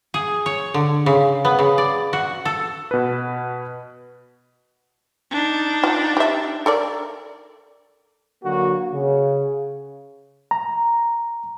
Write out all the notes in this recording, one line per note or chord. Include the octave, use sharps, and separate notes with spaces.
G#4
C#5
D3
C#3
B3
C#3
D5
F#4
A4
B2 B4
D4 D#4
F4
G4 E5
A4 A#4 D5
D3 F#3 A#3 F#4
C#3
A#5